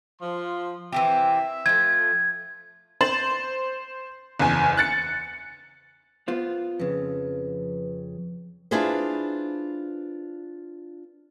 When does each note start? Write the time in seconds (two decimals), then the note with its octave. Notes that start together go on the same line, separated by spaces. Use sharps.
0.21 F3 C6
0.92 E3 C4 G4 E5
1.66 F3 A3 G#6
3.01 C5 A6 F#7
4.40 F#1 E2 G#5
4.77 F#6 A6 C#7
6.28 B3 F4 C5
6.80 F2 C#3 B4
8.71 D4 E4 F4 G#4 B4 C5